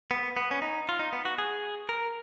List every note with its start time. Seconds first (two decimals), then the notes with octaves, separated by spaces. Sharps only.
0.11 B3
0.37 B3
0.51 C#4
0.62 D#4
0.89 F4
0.99 D#4
1.13 B3
1.25 F#4
1.38 G#4
1.89 A#4